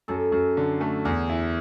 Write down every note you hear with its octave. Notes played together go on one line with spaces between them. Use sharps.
F#2 A4
F#2
D3
A3
E2 G#4
E4